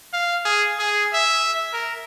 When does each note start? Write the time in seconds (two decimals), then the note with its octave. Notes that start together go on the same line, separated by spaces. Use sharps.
0.13 F5
0.45 G#4
0.79 G#4
1.13 E5
1.73 A#4